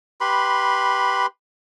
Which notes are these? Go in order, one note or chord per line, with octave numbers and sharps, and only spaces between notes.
G4 B4 B5 C6